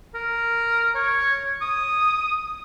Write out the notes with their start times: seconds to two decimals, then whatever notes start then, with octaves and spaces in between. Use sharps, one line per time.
0.15 A#4
0.95 C#5
1.62 D#6